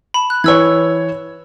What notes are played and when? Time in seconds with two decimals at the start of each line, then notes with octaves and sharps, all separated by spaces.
0.14 A5 B5
0.30 F#6
0.44 E3 B4 C#5 E6 G#6